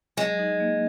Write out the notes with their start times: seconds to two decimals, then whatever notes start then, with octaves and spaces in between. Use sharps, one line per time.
0.17 F#3 G#3
0.39 D#4
0.60 A#3